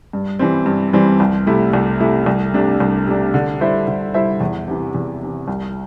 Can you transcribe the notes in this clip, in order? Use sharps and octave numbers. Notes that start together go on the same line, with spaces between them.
G2
E3 G3 C4
G2
E3 G3 C4
C2
C3 A3 E4
C2
C3 A3 E4
C2
C3 A3 D4
C2
C3 A3 D4
D3
G3 E4 C5 E5
D3
G3 E4 C5 E5
E2
C3 E3
E2
C3 E3
C2